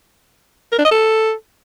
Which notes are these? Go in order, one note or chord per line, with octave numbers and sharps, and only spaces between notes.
A#4
D4
D#5
A4